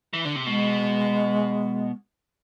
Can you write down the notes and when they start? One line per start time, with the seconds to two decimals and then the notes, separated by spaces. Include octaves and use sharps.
0.13 E3
0.25 D3
0.36 C3
0.46 B2 G#3